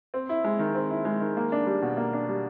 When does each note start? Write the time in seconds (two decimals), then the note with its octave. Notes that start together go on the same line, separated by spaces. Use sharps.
0.14 C4
0.29 E4
0.44 G#3
0.59 D#3
0.75 C4
0.90 E4
1.05 G#3
1.21 D#3
1.37 A#3
1.52 D4
1.67 G3
1.82 B2
1.97 A#3
2.13 D4
2.29 G3